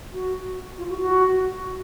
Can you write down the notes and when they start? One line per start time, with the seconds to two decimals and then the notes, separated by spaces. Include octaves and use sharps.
0.13 F#4
0.78 F4
0.89 F#4
1.00 F#4